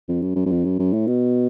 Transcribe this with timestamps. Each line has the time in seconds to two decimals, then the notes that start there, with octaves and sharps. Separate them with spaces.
0.08 F2
0.22 F#2
0.36 F#2
0.46 F#2
0.51 F2
0.65 F#2
0.79 F#2
0.93 A2
1.07 B2